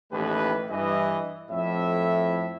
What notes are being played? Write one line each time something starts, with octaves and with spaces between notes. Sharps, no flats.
A1 D#2 A3 G4 B4
G2 E3 D#5
F2 A2 E4 E5